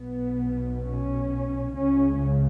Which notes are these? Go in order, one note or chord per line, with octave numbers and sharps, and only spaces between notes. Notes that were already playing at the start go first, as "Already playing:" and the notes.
Already playing: B1 B2 B3
C#4
C#2 C#3 C#4